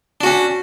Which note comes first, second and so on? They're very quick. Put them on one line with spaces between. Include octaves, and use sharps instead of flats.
D4 F#4 C#4